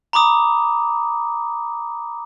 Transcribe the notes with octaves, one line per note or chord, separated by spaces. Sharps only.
A#5 B5 D6 D#6